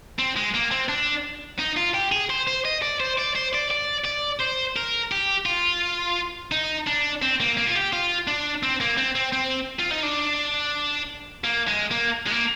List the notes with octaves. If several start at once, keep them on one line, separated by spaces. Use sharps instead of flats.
C4
G#3
A#3
C4
D4
D#4
F4
G4
G#4
C5
C5
D#5
D5
C5
D5
C5
D5
D5
D5
C5
A#4
G4
F4
D#4
D4
C4
A#3
A#3
F4
G4
F4
D4
C4
A#3
C4
C4
C4
F4
D#4
D4
A#3
G#3
A#3
G#3
A#3